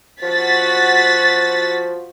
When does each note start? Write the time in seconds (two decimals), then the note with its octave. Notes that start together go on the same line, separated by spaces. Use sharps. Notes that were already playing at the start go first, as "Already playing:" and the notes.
0.23 F3 F#4 A6 B6